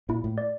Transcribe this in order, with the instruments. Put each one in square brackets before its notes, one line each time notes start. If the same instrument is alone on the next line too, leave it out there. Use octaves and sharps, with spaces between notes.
[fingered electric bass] A#2 [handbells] E4
[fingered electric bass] A2
[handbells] D5